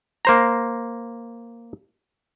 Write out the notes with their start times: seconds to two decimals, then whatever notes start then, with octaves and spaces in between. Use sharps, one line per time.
0.25 A#3 C5 A#5